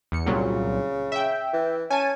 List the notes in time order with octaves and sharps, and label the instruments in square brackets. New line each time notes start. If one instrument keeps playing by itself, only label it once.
[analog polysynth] E2 C#7
[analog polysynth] C2 A#2 F#3 [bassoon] C#3
[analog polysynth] E5 G5
[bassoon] E3
[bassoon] C#4 [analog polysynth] G#5 A5 D#7